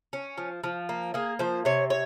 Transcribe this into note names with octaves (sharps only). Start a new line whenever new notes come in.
C#4
F3
F3
A#3
A#3 G#4
F3 C5
C3 C#5
C#5